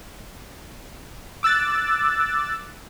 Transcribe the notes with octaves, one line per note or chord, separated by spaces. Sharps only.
D6 E6 F#6 A6